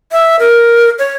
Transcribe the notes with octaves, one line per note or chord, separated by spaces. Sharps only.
E5
A#4
C#5